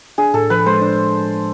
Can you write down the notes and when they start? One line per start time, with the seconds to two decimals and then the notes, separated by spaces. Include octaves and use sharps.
0.18 D4 G#4
0.34 A2 A4
0.50 F3 B4
0.66 G#3 C5
0.82 D4